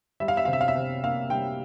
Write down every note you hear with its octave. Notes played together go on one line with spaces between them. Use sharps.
G3 E5
F5
E5
C3 F5
E5
F5
E5
C3
A#3 F5
G3 G5